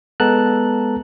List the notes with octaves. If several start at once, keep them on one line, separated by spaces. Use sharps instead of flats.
G#3 B3 A4 A5 A#5 F#6